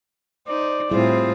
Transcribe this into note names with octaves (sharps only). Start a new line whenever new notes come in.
D#4 C5 D5
A2 G3 C4 E4 F4 G#4 C5